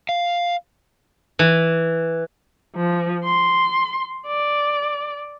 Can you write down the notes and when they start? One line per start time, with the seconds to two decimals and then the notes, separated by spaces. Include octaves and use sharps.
0.09 F5
1.39 E3
2.76 F3
3.24 C6
4.27 D5